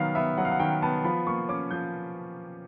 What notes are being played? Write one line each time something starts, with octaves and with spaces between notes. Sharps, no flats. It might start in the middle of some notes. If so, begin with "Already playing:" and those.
Already playing: D#3 F#3 B3 F5
B3 E5
F#3 F#5
F5
F#5
D#3 G5
B3 A5
F3 B5
A#3 C#6
C#4 D6
F3 G6